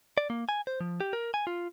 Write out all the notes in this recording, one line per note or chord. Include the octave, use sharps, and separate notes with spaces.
D5
A#3
G#5
C5
F3
G4
A#4
G#5
F4